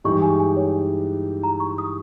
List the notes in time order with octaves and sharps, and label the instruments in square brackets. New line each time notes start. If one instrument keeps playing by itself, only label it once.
[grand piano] G2 E3 G#3 D#4 G4 [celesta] C#6
[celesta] G#5
G#5
C#5
A#5
C#6
D#6